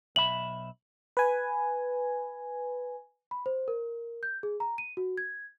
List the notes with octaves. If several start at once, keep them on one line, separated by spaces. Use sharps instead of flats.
B1 E5 B5 F#7
B4 G#5
B5
C5
A#4
G6
G#4
A#5
D#7
F#4
G#6